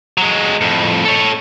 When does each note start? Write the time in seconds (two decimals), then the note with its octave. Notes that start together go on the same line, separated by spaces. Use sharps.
0.18 F#3 G#3
0.61 F2 A2
1.05 A4 C#5